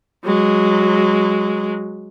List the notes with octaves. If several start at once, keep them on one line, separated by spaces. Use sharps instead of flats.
F#3 G#3